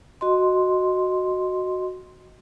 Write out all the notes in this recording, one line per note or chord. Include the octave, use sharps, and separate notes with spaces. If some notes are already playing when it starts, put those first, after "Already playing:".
F#4 D#5 C6